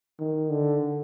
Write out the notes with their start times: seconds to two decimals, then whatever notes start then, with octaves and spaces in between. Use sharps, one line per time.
0.19 D#3
0.50 D3